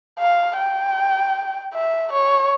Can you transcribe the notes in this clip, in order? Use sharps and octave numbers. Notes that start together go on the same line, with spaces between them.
F5
G5
E5
C#5